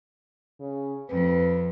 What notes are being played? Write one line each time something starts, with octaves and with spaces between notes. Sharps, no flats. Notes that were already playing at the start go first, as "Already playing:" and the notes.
C#3
F2 B4